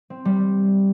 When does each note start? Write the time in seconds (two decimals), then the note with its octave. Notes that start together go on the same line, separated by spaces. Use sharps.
0.10 C4
0.25 G3